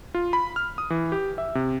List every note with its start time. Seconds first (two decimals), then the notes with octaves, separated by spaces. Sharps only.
0.14 F4
0.33 B5
0.56 F6
0.78 D#6
0.90 E3
1.12 G4
1.38 E5
1.55 C3